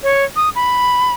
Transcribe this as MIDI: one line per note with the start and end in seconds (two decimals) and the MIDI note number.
0.03 0.24 73
0.36 0.50 87
0.56 1.14 83